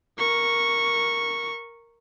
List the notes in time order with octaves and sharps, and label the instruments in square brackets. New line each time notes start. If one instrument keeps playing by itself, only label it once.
[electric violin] A#4 C#6